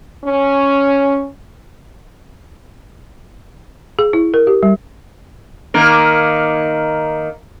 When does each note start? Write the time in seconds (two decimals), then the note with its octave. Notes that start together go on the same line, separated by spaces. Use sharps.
0.25 C#4
3.99 G#4
4.13 E4
4.34 A#4
4.47 G4
4.63 G3
5.74 D#3 A#3 A#4